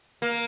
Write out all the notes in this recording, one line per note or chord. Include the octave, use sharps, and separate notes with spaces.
A#3